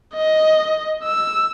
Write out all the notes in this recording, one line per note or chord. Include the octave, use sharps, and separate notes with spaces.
D#5
E6